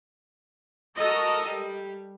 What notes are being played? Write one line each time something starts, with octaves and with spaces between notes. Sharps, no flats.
F#4 A4 A#4 D#5
G3